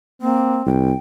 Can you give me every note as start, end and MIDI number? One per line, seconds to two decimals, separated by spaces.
0.22 0.62 58
0.22 0.69 60
0.66 0.93 36
0.66 0.98 79